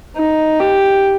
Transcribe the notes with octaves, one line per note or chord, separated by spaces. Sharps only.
D#4
G4